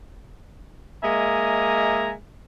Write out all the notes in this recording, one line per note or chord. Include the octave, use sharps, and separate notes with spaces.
G#3 A#3 D#5 E5 G#5 A#5